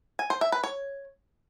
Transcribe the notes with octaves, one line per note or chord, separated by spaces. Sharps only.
G#5
C5
E5
B4
C#5